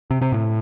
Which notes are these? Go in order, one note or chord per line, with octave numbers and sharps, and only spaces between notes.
C3
C3
A2